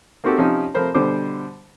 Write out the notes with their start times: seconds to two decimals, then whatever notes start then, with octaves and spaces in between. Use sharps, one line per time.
0.24 A#3 C4 D#4 F#4 G4 A4
0.38 C3 F3 C#4 D#4 G4
0.74 C3 F3 A3 A#4 C5 B5
0.94 B2 D3 G3 C5 D6